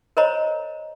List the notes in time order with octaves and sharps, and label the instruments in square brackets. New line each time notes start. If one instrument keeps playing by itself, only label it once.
[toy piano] A#4 C5 C#5 D#5 A#5